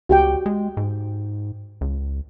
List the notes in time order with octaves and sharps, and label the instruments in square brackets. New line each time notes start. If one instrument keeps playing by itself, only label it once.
[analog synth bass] C#2 [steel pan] F#4 G4 G5
[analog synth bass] G#3
G#2
C#2